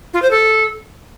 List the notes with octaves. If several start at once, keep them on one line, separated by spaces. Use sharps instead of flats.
F4
C5
A4